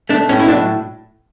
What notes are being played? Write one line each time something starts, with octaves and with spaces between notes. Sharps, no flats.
A3 D4
A2 C#4
E4
F#3 D4